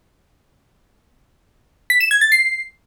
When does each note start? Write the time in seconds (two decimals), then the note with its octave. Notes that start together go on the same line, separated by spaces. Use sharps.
1.90 B6
2.00 E7
2.11 G#6
2.21 A6
2.32 C7